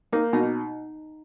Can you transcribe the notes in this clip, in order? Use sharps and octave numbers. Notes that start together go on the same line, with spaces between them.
A#3 D#4
B2 D#4
D#4